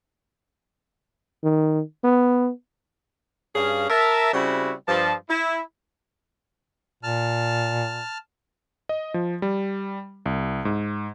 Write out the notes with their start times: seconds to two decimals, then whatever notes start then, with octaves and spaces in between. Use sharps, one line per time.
1.44 D#3
2.04 B3
3.55 G2 C#4 G#4 F5
3.90 A#4 E5 A5
4.34 C#3 G3 C4 E4 F#4
4.88 G2 F3 A5
5.29 E4
7.03 A#2 A5 F6
8.89 D#5
9.14 F3
9.42 G3
10.26 C2
10.65 G#2